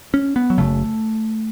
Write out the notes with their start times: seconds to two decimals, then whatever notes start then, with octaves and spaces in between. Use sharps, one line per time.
0.14 C#4
0.36 B3
0.50 F#3
0.58 F#1 F#2 C#3 A3